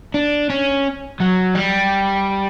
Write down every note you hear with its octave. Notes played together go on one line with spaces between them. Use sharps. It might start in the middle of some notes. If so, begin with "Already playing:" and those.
D4
C#4
F#3
G3